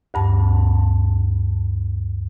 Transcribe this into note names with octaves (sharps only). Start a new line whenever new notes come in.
D2 G2 A5